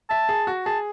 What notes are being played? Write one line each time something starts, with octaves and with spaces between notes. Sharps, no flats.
E5 A5
G#4
F#4
G#4 A5